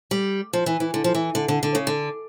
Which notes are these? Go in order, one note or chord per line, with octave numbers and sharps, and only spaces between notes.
G3
F3
E3
E3
D3
F3
E3
D3
D3
D3
C#3
D3